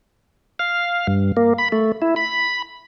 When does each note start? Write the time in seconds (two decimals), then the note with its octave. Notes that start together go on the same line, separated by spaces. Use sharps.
0.59 F5
1.07 G2
1.37 A#3
1.58 B5
1.72 A3
2.02 E4
2.16 B5